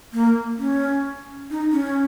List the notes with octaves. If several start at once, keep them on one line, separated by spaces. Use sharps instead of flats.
A#3
C#4
D#4
C#4